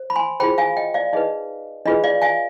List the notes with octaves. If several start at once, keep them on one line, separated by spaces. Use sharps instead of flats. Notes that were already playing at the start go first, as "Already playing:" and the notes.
Already playing: C5
B5
G#5 C6
F4 G#4 C5 G5 B5
F5 G#5
D#5 G5
D5 F5
D#4 G#4 B4 D#5
D4 F4 G#4 B4 D#5
D5 F5
F5 G#5